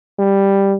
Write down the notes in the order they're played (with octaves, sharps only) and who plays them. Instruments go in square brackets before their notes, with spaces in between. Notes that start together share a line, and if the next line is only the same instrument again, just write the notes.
[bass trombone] G3